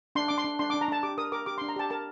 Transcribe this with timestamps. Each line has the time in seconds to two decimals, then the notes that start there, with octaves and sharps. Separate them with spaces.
0.15 D4 C6
0.28 D4 D6
0.38 C6
0.44 D4
0.59 D4 C6
0.70 D6
0.74 D4
0.81 A#5
0.88 D4 A5
1.03 G4 D6
1.18 A#4 D#6
1.32 A#4 D6
1.46 G4 D6
1.58 C6
1.61 D4
1.69 A#5
1.76 G4 A5
1.90 A#4 A5